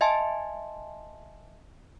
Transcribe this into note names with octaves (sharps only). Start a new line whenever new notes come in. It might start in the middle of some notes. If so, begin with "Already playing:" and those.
D#5 E5 G#5 A5 C6